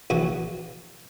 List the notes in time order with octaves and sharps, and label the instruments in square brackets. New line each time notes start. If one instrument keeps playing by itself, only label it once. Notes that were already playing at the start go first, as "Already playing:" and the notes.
[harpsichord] A#1 E3 F#4